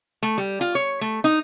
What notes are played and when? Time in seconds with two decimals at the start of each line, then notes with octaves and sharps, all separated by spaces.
0.23 A3
0.38 G3
0.61 F4
0.75 C#5
1.01 A3
1.24 D#4